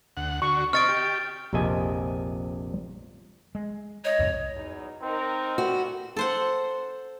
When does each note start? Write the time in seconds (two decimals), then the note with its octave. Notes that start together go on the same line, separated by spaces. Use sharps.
0.17 D2 F#5
0.42 D3 F#4 C#6
0.73 C4 D#5 C#6 F6 A6 D7
0.88 G4
1.53 A#1 F2 C3 D#5 G#5
3.55 G#3
4.04 C#5 D#5
4.19 C2 F2 G#2
4.54 E2 F#3 D#4
5.02 C4 D#4 A#4
5.58 G3 A3 B3 F#4
6.16 A4 C5 F#5